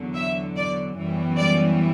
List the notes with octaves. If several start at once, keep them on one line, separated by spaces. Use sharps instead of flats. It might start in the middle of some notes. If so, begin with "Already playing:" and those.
Already playing: E2 D3 F#3
E5
D5
F#2 E3 G3 B3
D5